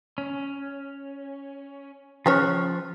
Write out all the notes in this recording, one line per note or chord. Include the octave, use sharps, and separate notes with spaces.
C#4
C#3 F3 C#4 C#5 F#6